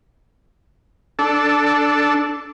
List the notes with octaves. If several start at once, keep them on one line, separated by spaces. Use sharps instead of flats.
D4 A4